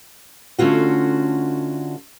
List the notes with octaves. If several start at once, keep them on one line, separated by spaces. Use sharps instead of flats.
D3 A3 C#4 F4 F#4